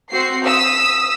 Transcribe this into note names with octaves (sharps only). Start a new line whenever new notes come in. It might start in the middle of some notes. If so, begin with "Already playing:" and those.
C4 F#4 C7
D#6 E6 B6